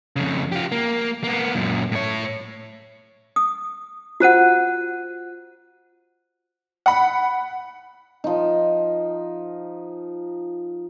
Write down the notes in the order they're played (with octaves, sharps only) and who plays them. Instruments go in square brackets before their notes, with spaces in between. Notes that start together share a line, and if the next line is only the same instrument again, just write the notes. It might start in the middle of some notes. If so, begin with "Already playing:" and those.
[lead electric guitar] F2 C#3
F4 G4
A#3
A#3 B3
F#2 A#2
A2 C#5
[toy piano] D#6
[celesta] F4 F#6 D#7 [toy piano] F#4 C5 F#5
[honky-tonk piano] F#5 B5
[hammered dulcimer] F3 D#4